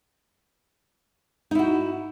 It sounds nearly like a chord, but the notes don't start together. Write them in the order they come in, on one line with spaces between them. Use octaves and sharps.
D#4 E4 F#4